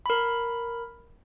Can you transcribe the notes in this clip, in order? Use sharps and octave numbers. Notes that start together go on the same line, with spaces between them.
A#4 B5